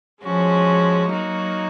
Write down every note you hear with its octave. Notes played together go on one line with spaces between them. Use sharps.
F3 G#3 C#4 F#4
F#3 A#3 D#4 F#4